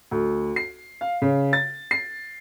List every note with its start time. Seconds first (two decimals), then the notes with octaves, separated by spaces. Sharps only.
0.11 D2
0.56 C7
1.01 F5
1.22 C#3
1.53 A6
1.91 C7